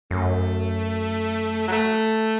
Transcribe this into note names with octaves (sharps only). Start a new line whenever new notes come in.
F#2 A3
F#3
A3